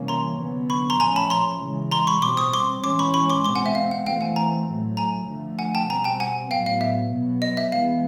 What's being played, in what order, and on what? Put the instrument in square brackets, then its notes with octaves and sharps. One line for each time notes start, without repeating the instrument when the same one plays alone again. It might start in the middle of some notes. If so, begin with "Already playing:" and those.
Already playing: [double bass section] C3 E3 G3 A#3 C#4
[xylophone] A#5 C6
[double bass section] D3 F#3 B3
[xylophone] B5 C#6
A#5 C6
[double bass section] A#2 F3 A3 C#4 [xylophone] G#5 A#5
[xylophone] A5 B5
A#5 C6
[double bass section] C#3 E3 G#3
[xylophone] A#5 C6
B5 C#6
[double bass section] B2 G3 C4 [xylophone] C6 D6
[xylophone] C#6 D#6
C6 D6
[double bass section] E3 G#3 C#4 [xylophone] C6 D6
[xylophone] B5 C#6
B5 C#6
C6 D6
[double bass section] B2 G#3 C4 [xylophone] C6 D6
[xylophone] F#5 G#5
E5
F5
F#5
[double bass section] E3 A3 C4 [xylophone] F5 G5
[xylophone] F#5 G#5
G#5 A#5
[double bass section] A2 F#3 A3
[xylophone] G#5 A#5
[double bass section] D3 F3 A3
[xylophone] F#5 G#5
G5 A5
[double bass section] B2 G3 C4 [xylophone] G#5 A#5
[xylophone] G5 A5
F#5 G#5
[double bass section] A2 F#3 B3 [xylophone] F5 G5
[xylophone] F5
E5
[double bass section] B2 F#3 B3
[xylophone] D#5
E5
[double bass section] E3 G#3 B3 [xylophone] F5